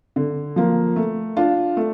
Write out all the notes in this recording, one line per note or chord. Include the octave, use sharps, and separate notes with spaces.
D3
F3 A#3
A3
D4 F4
A3